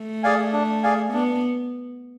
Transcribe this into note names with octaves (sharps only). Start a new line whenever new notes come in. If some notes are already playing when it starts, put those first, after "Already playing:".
Already playing: A3
G#4 D5 F5 G#5
D4
G#4 D5 F5 G#5
B3 D4